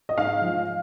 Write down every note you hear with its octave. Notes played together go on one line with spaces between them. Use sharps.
D#5
G#2 F5
F3 G#3